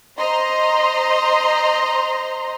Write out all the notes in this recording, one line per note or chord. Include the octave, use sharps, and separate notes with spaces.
C5 D#5 A#5 C6